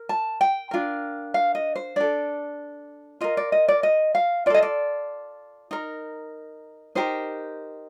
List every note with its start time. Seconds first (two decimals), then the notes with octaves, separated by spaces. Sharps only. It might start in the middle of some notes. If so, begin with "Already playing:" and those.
Already playing: A#4
0.09 A5
0.41 G5
0.71 D4 F4 A#4
1.34 F5
1.55 D#5
1.76 C5
1.96 D4 A4 D5
3.21 F4 A#4 D#5
3.37 D5
3.52 D#5
3.68 D5
3.83 D#5
4.15 F5
4.46 F4 D5
4.50 A4 D#5
4.62 D5
5.71 D#4 A#4
6.95 D#4 G4 A#4 C5